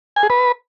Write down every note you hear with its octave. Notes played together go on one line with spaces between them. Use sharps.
G#5
G#4
B4